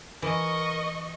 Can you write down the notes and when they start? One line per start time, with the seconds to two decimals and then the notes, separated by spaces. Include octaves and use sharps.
0.22 E3 A#4 D#5 C#6